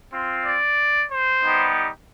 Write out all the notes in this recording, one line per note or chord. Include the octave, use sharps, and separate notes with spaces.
C4 F4
D5
C5
G3 B3 D#4 G4